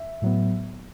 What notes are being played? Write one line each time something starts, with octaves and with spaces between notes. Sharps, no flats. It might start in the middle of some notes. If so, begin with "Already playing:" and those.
Already playing: E5
A2 F#3 B3